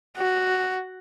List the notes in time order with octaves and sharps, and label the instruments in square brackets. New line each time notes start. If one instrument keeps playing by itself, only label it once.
[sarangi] F#4